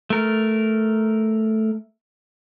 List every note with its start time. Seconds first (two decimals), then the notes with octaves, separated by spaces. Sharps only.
0.10 A3 A#4